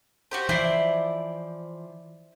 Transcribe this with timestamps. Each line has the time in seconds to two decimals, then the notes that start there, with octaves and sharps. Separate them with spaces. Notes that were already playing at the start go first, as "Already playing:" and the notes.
0.31 F#4 G4 C5
0.49 E3 F3 E4 C5 D5